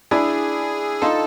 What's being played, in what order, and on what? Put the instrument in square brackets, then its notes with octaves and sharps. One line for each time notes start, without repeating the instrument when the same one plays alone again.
[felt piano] D4 E4 [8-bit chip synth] G#4
[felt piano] D#4 F4 [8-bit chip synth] A4